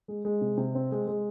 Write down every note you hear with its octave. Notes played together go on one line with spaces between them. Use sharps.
G#3
G#3
C3
C3
C4
G#3
G#3